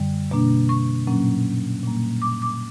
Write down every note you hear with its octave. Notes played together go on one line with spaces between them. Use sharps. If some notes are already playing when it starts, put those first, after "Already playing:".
Already playing: F#2 D3 G3
B2 A#3 D4
C#6
A#2 F#3 A#3 C#4
A#2 G3 A#3
D6
D6